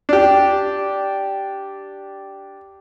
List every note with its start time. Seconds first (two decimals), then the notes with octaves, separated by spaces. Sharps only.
0.09 D4 G4